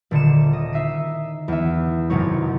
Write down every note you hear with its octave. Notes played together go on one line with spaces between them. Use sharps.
D#1 D3 C#7 E7
D#5
D#4 E5 C7 D#7
E2 E5
G#1 F#2 C3 F#3 D#4 C#5